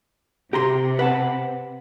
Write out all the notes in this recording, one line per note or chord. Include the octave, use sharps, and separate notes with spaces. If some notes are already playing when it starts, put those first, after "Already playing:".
C3 G4 A#5 C6
B4 F#5 A5